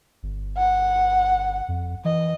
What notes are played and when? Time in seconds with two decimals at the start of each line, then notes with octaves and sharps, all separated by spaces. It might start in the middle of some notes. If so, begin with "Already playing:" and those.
0.23 G1
0.57 F#5
1.68 F2
2.05 E3 D#5